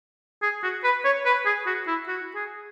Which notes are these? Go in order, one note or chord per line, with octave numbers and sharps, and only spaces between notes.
G#4
F#4
B4
C#5
B4
G#4
F#4
E4
F#4
G#4